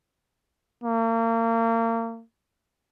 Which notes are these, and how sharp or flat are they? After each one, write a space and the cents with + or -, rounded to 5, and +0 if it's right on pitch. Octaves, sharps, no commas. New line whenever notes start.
A#3 -35